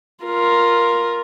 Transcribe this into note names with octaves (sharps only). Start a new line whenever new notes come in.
F4 A#4